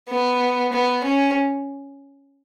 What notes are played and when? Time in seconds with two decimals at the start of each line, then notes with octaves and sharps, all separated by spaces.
0.09 B3
0.73 B3
1.04 C#4